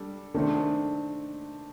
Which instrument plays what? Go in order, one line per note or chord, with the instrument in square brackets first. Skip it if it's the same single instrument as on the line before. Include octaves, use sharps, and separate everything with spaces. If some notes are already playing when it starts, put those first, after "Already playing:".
Already playing: [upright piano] G3 D4 A4
[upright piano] D#3 A3 C4 [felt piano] D4